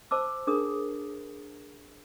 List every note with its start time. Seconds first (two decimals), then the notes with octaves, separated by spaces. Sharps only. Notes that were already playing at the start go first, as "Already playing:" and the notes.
0.11 C5 A5 D6 E6
0.47 D4 G#4 A#4 D#6